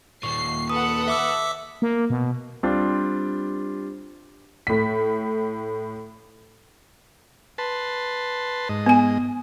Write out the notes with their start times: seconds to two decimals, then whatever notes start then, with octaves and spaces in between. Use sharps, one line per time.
0.23 D#2 A#2 C#6 C7
0.69 A4 B4 F#5 D#6
1.08 E5 D6 E6
1.82 A#3
2.10 B2
2.63 G3 C4 D4 F4 G4
4.67 A2 B6
7.58 B4 A5 C6
8.69 G#2 D#5
8.86 B3 G#5